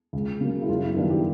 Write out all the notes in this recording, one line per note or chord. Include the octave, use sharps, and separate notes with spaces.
C#2
C#3 F#3 A#3
E4
F#2 F4
E4
D#3 G3 B3 D4 F4
G4